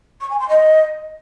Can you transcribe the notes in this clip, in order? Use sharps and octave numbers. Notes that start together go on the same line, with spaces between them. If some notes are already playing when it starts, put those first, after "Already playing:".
C#6
G#5
C6
D#5